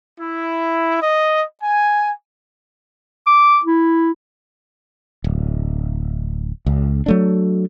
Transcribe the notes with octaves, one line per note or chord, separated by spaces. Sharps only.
E4
D#5
G#5
D6
E4
D1
C#2
F#3 A3 D4